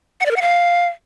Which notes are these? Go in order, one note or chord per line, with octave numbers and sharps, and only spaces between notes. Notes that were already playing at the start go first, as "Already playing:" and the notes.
F#5
D5
A#4
F#5
F5